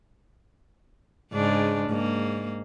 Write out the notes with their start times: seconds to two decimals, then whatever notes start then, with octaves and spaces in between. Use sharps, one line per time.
1.32 G#2 C#3 D4
1.89 G#2 A#3